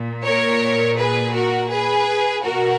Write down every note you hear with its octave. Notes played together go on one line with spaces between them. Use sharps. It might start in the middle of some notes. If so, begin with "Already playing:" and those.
Already playing: A#2
A#4 C#5
G#4 B4
F#4 A#4
G#4 B4
B2 F#4 A#4